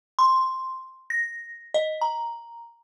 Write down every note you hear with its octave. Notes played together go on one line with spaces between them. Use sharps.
C6
A#6
D#5
A#5